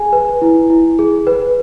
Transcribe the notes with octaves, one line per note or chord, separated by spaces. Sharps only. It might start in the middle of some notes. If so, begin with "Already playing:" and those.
Already playing: G#4 G#5
B4
E4
E4
G#4
B4